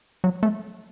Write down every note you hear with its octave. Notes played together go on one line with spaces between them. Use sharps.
F#3
A3